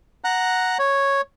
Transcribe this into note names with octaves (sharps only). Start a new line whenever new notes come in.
F#5 A#5 F#6
C#5